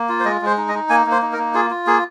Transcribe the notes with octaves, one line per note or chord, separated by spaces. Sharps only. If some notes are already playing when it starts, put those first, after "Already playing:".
Already playing: A#3
F4
C5
G#3 D#5
G#3 C5
D#4
D#5
D#4
A#3 G#5
A#3
C5
D#4
A#4
A#3
F4 G#4
F4
A#3 G#4